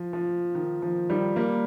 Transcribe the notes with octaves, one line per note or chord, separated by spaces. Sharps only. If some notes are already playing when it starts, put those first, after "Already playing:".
Already playing: F3
F3
D#3
F3
D#3 G3
G3 A#3